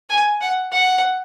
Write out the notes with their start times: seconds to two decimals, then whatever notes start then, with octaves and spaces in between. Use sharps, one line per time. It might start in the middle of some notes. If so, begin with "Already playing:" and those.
0.10 G#5
0.41 F#5
0.72 F#5